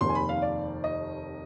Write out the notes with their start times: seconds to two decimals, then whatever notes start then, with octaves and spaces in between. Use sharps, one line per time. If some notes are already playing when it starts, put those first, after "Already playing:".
0.01 F1 D#2 D#3 C6
0.09 G#5
0.15 B5
0.29 F5
0.42 D5
0.84 D#5